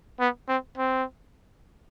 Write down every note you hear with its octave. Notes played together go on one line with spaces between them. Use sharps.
B3
C4
C4